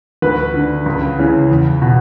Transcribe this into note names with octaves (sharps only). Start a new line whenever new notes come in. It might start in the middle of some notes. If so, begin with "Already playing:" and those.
D2 B4
D3
C#2
C#3 E3
E2
B2